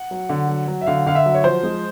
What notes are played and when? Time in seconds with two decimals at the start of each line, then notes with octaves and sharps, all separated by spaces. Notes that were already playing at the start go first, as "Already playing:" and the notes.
Already playing: F#5
0.11 F#3
0.29 D3
0.48 F#3
0.67 F#3
0.81 E5
0.86 D3 F5
1.06 D3 F5
1.15 E5
1.26 F#3
1.35 C#5
1.44 F3 C5
1.63 G#3